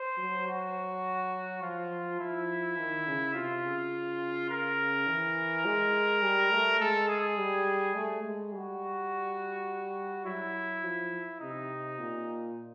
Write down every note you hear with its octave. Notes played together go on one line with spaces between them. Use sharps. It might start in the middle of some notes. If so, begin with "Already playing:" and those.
Already playing: C5
F#3
F#4
F3 F4
F3 E4
D#3
C#3
C3 F4
C#3
A#4
E3
G#3
G3
A3
G#3 A4
G#4
G3
A3
G#3
G3 F#4
F#3 E4
F3
C3 D#4
A#2